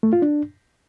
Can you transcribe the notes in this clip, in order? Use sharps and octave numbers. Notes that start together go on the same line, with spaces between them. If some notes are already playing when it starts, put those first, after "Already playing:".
A3
F4
D4